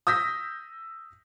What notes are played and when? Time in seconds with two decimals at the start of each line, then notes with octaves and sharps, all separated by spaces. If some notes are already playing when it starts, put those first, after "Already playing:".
0.07 D#6 E6 G6 A#6 B6